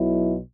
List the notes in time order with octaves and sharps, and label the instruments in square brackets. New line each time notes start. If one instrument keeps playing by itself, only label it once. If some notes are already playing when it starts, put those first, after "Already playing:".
Already playing: [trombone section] B1 B2 F#3 E4